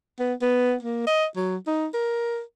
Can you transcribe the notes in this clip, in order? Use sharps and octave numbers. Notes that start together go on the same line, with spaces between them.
B3
B3
A#3
D#5
F#3
D#4
A#4